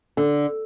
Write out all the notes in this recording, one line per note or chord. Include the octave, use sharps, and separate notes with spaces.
D3